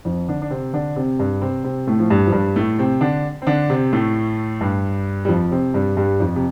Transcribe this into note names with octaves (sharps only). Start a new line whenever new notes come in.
F2 F3
D3 D4
D4
C3 C4
D3 D4
C3 C4
G2 G3
C3 C4
C3 C4
A2 A3
F3
G2 G3
F3
G2 G3
A2 A3
C3 C4
D3 D4
C4
D3 D4
C3 C4
A2 A3
G2 G3
G3
F2 F3
C3 C4
G2 G3
G2 G3
F2 F3
C3